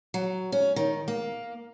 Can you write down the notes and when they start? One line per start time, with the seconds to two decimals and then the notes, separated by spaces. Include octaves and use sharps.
0.14 F#3
0.52 C#4
0.76 D#3
1.08 A#3